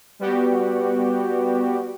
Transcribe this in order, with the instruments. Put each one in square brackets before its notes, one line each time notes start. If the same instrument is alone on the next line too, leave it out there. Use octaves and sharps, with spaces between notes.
[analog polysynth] G3 B3 F#4 G4